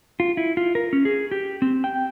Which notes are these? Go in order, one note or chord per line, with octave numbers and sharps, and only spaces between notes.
F4
E4
F4
A#4
C#4
G#4
G4
C4
G5